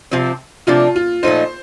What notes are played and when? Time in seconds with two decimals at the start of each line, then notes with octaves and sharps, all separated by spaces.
0.11 C3 F3 C4
0.67 C3 F3 A3 D4 F4
0.96 F4
1.23 A#2 F3 A3 D#4 C5